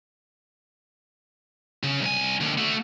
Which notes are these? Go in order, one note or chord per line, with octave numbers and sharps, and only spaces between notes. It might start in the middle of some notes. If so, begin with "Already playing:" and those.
C#3
C2 G#5
D#2 D3
A3 F#4